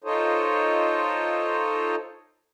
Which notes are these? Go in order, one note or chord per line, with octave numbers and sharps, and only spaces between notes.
D#4 F4 A4 C5 C#5 D#5